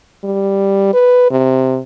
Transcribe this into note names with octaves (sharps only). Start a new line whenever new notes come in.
G3
B4
C3